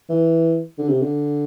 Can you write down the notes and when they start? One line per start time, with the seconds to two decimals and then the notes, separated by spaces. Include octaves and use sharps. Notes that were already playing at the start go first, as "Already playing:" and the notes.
0.09 E3
0.78 D3
0.89 C3
1.02 D3